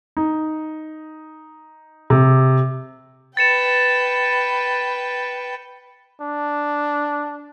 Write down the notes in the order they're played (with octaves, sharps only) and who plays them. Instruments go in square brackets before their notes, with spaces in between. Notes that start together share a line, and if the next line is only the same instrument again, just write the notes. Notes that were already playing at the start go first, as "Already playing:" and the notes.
[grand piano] D#4
C3
[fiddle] B4 G5 [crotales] A6 C#7 E7
[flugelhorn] D4